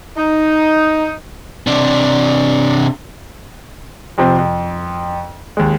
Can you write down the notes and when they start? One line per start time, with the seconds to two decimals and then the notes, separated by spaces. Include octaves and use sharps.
0.17 D#4
1.67 C3 D4
4.18 F2 C3 F3 C4
4.39 F2
5.57 D#2 G#3